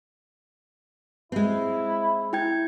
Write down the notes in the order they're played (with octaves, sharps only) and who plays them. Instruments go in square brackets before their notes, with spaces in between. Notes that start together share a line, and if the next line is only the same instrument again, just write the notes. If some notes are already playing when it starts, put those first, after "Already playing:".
[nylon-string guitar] G#3 C4 [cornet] E4
[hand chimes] E4 G5 G#6